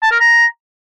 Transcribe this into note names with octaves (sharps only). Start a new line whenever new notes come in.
A5
A#4
A#5